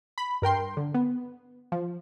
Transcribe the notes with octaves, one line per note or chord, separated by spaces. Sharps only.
B5
G2 A#4 G5 C6
D3
B3
F3